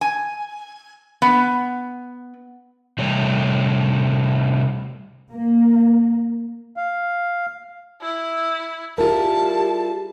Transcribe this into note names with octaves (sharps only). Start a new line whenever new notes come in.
G#5
B3
C3 G3 A3 C#5
A#3
F5
E4
G3 E4 F4 G4 G#4 A#4 A5